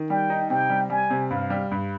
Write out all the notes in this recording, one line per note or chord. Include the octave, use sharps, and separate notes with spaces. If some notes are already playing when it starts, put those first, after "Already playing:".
Already playing: D#3
G3 G5
D#4
C3 G5
G3
G3 G#5
C3
G2 F5
G3
G2